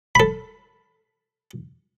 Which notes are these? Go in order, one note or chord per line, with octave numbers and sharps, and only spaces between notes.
A4 B5